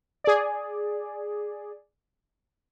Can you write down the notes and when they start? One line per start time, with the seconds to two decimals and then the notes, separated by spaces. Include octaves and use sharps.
0.24 G#4 D5